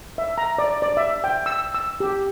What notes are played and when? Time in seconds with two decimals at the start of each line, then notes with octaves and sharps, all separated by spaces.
0.18 E5
0.38 A#5
0.58 D5
0.82 D5
0.97 E5
1.24 G5
1.46 E6
1.75 E6
2.00 G4